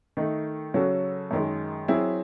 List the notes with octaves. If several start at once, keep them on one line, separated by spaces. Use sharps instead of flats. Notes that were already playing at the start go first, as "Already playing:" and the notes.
D#3 A3 D#4
C#3 F#3 C#4 F#4 A4
F#2 D#3 G#3
F#3 C4 E4 G#4